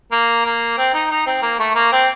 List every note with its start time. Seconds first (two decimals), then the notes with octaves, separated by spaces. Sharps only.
0.12 A#3
0.45 A#3
0.78 C4
0.94 D#4
1.10 D#4
1.27 C4
1.42 A#3
1.59 A3
1.75 A#3
1.92 C4